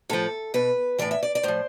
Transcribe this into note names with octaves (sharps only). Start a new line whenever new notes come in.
A2 F3 A4
B2 B4
A2 E3 D5
E5
D5
D5
A2 F3 C5